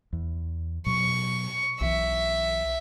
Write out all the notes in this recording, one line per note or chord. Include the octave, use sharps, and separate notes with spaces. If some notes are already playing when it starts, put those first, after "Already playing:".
E2
B2 F#3 C#6
B1 E3 E5